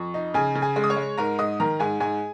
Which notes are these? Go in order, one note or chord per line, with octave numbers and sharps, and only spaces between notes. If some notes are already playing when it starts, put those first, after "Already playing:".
Already playing: F2 C#6
D#4
C#3 G#4 G#5
C#3
G#4 G#5
G#3
D#6
C#5 C#6
G#3
G#2 A#4 A#5
G#2 D#5 D#6
D#3 A#4 A#5
G#2 G#4 G#5
G#2 G#4 G#5